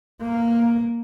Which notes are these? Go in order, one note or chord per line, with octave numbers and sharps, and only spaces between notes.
A#3